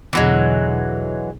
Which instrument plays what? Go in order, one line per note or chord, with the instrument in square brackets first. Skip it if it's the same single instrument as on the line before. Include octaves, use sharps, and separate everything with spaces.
[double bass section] B1 E2 D3 [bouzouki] E3 F#3 G#3